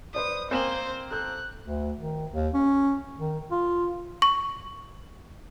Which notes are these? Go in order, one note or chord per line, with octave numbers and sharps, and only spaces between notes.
B4 C5 D5 D#6
A#3 C4 C5 G#5 E7 F#7
A4 F#6 G6
D2
D#3
D#2
C#4
D#3
F4
C#6